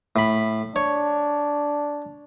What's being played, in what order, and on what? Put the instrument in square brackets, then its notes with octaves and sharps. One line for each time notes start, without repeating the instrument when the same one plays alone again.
[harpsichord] A2 B5
[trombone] D4 [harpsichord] C#5